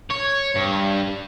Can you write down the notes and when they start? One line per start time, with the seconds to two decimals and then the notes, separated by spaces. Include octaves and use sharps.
0.11 C#5
0.55 G2